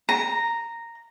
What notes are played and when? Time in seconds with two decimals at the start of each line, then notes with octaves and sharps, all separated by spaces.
0.09 A#5